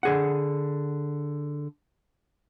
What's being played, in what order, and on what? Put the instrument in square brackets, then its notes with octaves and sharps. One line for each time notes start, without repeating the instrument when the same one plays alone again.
[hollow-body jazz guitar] D3 G#4 F#5